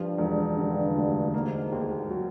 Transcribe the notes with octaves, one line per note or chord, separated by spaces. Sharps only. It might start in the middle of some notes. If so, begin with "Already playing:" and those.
Already playing: G2 F3
E1
G2 D3
D2
G#2 A#3
D#2
F#3